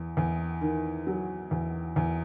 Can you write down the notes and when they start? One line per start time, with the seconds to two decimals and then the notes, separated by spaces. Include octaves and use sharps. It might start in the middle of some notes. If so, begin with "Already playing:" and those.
Already playing: E2
0.17 E2
0.61 D#3
1.07 F#3
1.51 E2
1.96 E2